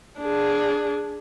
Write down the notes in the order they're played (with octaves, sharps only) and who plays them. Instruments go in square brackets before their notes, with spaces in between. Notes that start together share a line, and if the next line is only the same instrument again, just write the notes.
[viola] D4 G#4